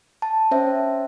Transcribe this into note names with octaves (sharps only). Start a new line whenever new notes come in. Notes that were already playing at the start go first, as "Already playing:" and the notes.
A5
C#4 C5 E5